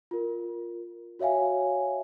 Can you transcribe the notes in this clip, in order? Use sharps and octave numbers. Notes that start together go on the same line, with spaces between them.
F4 A#4
F#4 C#5 E5 F5 G#5